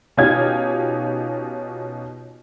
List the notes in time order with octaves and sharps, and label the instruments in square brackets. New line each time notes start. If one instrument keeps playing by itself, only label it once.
[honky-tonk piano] B2 C#4 D#4 F4 G4 G#6